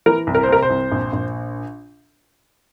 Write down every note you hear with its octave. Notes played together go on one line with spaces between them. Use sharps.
E3 A#4
C2
A#4
C5
C3 A#4
C5
C2
A#1
A#1